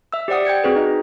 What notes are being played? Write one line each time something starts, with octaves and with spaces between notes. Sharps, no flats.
E5 E6
G4 C5 D5 F#5 D#6
G5 G6 G#6 C#7
C4 F#4 G#4 B4
D#4 D#5